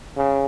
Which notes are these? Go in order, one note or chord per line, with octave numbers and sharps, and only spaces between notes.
C#3